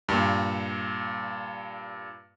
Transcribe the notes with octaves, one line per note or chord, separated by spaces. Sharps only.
G2 A#2